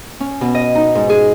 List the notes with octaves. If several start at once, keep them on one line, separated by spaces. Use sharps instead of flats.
C#4
B2
D#5
D#4
G#2
G#4